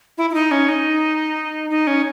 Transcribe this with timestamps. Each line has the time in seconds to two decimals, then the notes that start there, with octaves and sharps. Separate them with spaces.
0.18 E4
0.30 E4
0.34 D#4
0.51 C#4
0.69 D#4
1.70 D#4
1.87 C#4